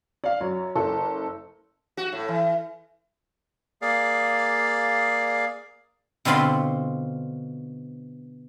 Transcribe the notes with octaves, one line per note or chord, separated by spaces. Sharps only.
D5 F5
F#2 C#5
F#1 A4
F#4
A2
E3
A#3 G#4 D5 F5
B2 D3 C4 F4 B5 C6